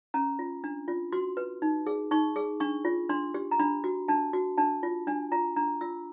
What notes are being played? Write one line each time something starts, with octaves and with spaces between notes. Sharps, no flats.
C#4 A#5
F4
D4
F4
F#4 C6
B4
D#4
G#4
D#4 C#6
G#4
D4 C#6
F4
D4 C6
G4
A#5
D4 B5
F#4
D4 A5
F#4
D4 A5
F4
D4 G#5
F4 A#5
D4 A#5
F4 E6